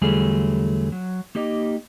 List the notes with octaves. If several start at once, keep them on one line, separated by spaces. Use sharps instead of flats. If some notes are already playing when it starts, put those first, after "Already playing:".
E2 D3 F#3 G3 A3 G#4
F#3
A#3 D#4 G4 D#5